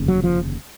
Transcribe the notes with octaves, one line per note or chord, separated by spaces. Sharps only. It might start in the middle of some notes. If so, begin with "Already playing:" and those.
Already playing: F1 D#2 C#3
F#3
F3